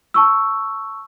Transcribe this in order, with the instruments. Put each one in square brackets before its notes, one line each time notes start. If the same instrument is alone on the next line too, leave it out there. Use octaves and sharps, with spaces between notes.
[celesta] A5 C#6 E6